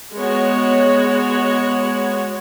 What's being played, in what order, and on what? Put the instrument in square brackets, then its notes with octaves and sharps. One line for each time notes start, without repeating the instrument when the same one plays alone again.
[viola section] G#3 B3 F#4 C#5